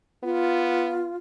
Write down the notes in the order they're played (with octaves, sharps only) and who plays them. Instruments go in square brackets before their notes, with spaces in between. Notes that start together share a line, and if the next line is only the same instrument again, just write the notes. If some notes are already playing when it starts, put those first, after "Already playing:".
[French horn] B3 [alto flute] F4